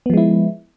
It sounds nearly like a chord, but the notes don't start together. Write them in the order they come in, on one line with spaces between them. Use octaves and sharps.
B3 F3 G#3 E4